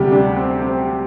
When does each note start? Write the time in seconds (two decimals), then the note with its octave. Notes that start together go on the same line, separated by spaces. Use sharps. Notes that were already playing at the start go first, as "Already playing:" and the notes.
Already playing: D2 C3 G3 G4
0.12 D4
0.36 C4
0.62 C4